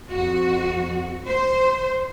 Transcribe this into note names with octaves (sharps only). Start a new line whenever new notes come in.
F2 F#4
C5